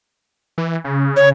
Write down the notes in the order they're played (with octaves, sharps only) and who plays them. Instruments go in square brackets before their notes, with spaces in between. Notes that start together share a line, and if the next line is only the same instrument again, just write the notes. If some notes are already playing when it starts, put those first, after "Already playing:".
[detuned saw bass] E3
C#3
[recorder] C#5